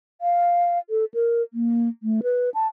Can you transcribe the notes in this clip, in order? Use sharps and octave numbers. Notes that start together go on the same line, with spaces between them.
F5
A4
A#4
A#3
A3
B4
A5